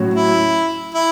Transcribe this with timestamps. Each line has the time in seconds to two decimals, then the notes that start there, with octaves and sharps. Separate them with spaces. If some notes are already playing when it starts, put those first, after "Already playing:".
Already playing: A2 F#3 C#4 F#4
0.14 E4
0.94 E4